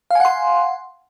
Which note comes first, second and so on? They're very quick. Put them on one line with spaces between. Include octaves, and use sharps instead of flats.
F5 G#5 F#5 C6